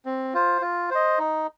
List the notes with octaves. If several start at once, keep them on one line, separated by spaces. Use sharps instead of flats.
C4
F4 C5
F4
C5 D#5
D#4